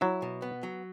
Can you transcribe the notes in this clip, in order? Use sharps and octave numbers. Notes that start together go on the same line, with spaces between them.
F#3 E4
B2
B3
F#3